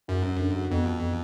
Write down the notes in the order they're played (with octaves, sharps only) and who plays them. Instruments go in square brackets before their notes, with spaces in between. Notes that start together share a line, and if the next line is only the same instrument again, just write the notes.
[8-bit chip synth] F#2 [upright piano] F#4
[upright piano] C#4
D3
F#4
[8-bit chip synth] F2 [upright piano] B3
[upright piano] B3